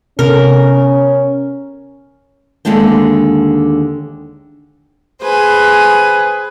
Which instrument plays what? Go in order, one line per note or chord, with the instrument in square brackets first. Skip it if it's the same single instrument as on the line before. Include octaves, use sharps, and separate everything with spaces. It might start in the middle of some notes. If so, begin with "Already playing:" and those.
[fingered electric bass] C3 B3 [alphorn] C#4 [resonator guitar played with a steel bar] A#4
[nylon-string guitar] D#2 D3 G#3 D4 G5
[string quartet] G#4 B4 C5 G#5